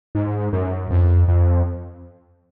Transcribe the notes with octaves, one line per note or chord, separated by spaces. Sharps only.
G#2
F#2
F2
F2